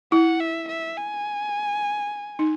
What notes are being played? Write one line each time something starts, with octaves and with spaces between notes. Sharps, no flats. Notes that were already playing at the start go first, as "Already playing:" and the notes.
E4 F#5
E5
E5
G#5
D#4